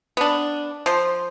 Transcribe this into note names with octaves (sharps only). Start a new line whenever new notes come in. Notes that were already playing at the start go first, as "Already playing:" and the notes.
B3 D4
F3 C5